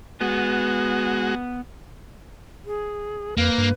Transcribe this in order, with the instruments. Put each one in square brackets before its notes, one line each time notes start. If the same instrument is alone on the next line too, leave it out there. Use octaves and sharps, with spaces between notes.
[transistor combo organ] G#3 F#4 [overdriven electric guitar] B3
[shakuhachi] G#4
[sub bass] F2 [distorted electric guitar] A#3 [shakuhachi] B4
[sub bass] G2